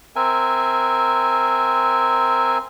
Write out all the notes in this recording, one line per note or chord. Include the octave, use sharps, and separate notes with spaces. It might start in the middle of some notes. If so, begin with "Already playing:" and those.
C4 A#4 E5 G#5